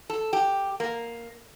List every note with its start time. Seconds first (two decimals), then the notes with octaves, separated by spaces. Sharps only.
0.10 A4
0.33 G4
0.80 A#3